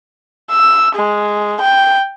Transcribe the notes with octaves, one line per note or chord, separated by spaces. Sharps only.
E6
G#3
G5